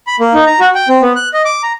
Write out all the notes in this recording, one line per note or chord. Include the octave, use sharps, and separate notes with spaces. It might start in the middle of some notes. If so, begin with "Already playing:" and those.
B5
A#3
D#4
A#5
F#4
G5
C4
B3
F#6
D#5
D6
A#5